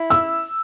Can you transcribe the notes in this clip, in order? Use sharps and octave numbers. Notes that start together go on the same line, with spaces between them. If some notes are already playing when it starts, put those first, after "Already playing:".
Already playing: E4
E6